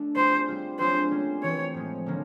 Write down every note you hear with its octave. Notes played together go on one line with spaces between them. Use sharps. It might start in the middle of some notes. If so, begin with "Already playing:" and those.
Already playing: A3 D4 A4
G3 C4 F4 G#4 C5
G3 C4 F4
F#3 A3 D4 F4 G#4 C5
G3 A#3 C#4
E3 A3 C4 C#5
A2 F3 G#3
D3 F3 A#3 C#4